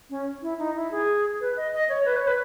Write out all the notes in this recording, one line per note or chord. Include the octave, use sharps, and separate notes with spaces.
C#4
E4
D#4
E4
G#4
B4
D#5
D#5
C#5
B4
C#5
B4